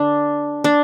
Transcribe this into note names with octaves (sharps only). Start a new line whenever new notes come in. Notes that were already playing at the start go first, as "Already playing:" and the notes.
Already playing: D3 D4
D4